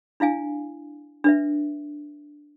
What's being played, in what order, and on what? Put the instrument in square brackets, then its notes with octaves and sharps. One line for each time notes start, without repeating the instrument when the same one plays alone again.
[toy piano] D4 E4 F5 G#5
D4 B4 E5